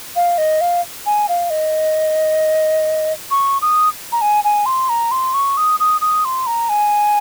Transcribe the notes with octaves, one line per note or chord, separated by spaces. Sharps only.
F5
D#5
F5
G#5
F5
D#5
C#6
D#6
A#5
G#5
G#5
C6
A#5
C6
C#6
D#6
D#6
D#6
C6
A#5
G#5